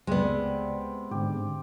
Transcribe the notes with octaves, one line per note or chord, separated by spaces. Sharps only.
C#2 C3 G#3 B3 C4 D5
G#2 D3 G4